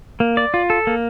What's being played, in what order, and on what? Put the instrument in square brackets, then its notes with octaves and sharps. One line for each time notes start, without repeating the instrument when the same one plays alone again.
[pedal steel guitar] A#3
D5
F4
A4
A#3